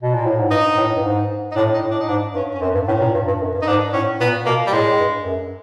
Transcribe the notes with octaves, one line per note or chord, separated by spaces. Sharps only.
B2
A#2
A2
G#2
G2 D#4
A2
G2
G#2
D#4
A2 D4
D#4
A2
D4
D#4
G#2 D4
G2 C#4
C#4
F#2 C4
G2
A2 C#4
A#2
G2
G2
F#2
G2
D#4
G#2 D4
A2 C#4
A#2 B3
B2 A#3
G3
A2 G#3
G2
F#2